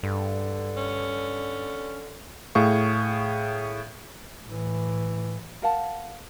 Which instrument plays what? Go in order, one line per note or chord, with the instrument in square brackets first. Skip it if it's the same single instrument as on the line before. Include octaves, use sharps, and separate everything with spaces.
[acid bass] G2 [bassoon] D3
[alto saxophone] C#4
[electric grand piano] A2 G#4 F5 C#6
[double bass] A2 E3
[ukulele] A#4 F5 F#5 A5